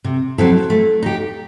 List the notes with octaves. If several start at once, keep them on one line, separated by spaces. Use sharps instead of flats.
C3
F#3 C4 E4 A4
A3
D#4 G4